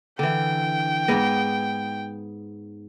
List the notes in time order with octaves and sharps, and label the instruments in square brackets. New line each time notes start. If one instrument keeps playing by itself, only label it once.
[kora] D3 E3 [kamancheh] G5
[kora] G#2 B3 D#5